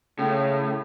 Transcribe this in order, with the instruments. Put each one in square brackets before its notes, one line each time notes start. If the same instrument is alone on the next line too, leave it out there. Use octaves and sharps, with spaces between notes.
[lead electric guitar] A2 [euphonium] C#3